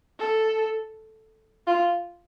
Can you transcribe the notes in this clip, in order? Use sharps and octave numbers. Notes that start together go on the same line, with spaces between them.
A4
F4